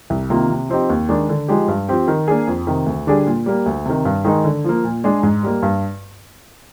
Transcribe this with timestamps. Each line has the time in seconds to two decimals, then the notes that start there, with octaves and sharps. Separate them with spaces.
0.10 C2
0.30 C3 D#3 A#3 F4
0.50 C3
0.69 F3 C4 D#4 G4
0.89 D#2
1.09 D#3 G#3 D4
1.29 D3
1.48 F3 G#3 D#4 G4
1.68 G2
1.89 F3 C4 G4
2.08 D#3
2.28 A#3 D4 G#4
2.47 F2
2.67 C3 D#3
2.86 D2
3.07 D3 G3 D4 G#4
3.27 A#2
3.46 G3 A#3
3.66 D2
3.86 C3 D#3
4.05 G2
4.25 D#3 G#3 D#4
4.44 D3
4.64 F3 A#3
4.84 A#2
5.04 G#3 D4 G#4
5.23 G#2
5.43 G3 A#3
5.62 G2